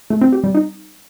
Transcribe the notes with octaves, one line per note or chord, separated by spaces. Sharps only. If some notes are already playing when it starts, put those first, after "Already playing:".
A3
C4
G4
G3
D#4